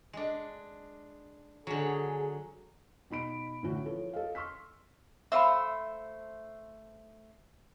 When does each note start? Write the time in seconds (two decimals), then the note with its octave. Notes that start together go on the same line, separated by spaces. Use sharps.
0.13 G#3 D4
1.67 D3 F#3 G#4
3.10 B2 D#4 B5 D7
3.63 A2 D3 E3 C#4 E4 F#4
3.86 F3 E4 A4 B4 C#5
4.13 A4 D#5 F5
4.35 C6 C#6 E6 F6 B6
5.32 A3 C5 E5 F5 B5 E6